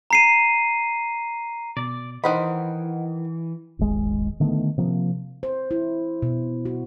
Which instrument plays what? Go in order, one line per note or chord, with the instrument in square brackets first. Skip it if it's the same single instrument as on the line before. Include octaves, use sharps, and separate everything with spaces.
[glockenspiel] A#5 C7 D#7
[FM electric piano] B2 [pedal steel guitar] D5
[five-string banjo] D#3 C5 B5 [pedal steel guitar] E3 [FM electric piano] D#5 F#5
[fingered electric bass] D#1 G#1 G#3
D3 D#3 A3 B3
C3 F3 A#3
[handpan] C5
E4
B2
F#4